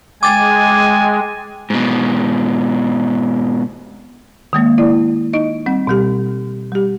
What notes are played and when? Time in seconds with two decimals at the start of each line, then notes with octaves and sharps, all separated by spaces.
0.23 G#3 G5 G#5 D6 A6
1.70 G#2 B2
4.53 D#3 G#3 A#3
4.78 E4 D5
5.33 D#4 D#5
5.66 G3 C4 F#5
5.87 B2 G3 G4
6.72 G3 G4